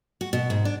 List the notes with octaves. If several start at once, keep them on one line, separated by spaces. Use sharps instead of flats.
F#4
B2
G#2
D4